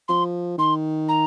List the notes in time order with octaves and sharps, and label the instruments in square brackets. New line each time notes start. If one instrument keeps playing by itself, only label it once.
[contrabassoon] F3 [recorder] C6
[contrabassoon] D#3 [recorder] C6
[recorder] A#5